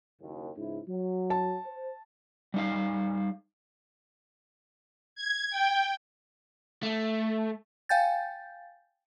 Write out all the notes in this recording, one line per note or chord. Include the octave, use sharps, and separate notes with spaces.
F#1 D#2
C#2 G#2 E4
F#3
A5
C5
G3 D#4 F5
G#6
G5
A3
F5 G5 G#5 G6 A6